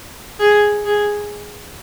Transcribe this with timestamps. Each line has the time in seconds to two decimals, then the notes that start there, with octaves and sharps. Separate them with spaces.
0.40 G#4
0.84 G#4